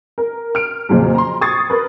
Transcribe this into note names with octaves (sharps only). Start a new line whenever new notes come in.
A#4
F6 D7
F2 A#2 C#3 F#3
A#5 C6
C#6 D#6 G#6 A6 C7
A#4 B4